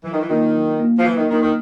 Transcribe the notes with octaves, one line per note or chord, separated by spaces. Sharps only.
E3 F#3
D#3
E3
D#3 A#3 D4 F4
F#3
A#3 D4 F4
F3
E3 F#3
D#3
D#3 A#3 D4 F4
D#3